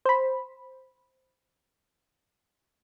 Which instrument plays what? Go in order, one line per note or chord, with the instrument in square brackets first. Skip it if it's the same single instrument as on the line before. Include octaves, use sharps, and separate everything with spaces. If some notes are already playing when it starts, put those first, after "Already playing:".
[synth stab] C5 B5